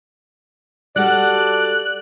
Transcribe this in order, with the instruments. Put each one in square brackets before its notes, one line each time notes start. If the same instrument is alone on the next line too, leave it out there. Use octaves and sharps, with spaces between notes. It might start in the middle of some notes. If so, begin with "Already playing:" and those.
[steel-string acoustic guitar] G3 F#4 A4 [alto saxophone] D5 [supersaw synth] F#6